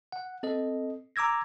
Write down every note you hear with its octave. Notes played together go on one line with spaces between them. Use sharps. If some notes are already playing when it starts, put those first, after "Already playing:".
F#5
C4 A4 D#5
A#5 D6 E6 G#6 A#6